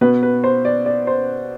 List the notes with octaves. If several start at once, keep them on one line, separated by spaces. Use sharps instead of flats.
B2 B3 B4
B4
C5
D5
D5
C5